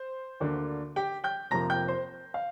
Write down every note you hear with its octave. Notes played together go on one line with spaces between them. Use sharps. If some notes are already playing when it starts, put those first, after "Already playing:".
Already playing: C5
D2 D3 A#3 D4
G4 G5
G5 G6
F1 F2 C3 F3 A#3 A#5 A#6
G5 G6
C5 C6
F5